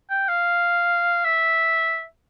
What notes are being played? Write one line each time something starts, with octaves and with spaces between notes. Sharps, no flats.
G5
F5
E5